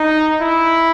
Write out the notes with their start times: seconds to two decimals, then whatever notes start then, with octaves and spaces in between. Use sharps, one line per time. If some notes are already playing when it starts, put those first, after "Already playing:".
Already playing: D#4
0.41 E4